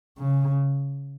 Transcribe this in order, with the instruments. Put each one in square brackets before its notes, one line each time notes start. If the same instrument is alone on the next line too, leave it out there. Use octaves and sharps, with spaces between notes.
[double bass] C#3